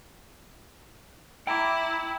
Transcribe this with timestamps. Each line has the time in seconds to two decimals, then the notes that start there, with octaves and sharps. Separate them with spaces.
1.47 E4 G5 A#5 D6